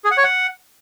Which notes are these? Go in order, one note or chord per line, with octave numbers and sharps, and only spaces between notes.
G#4
F#5
C#5
F#5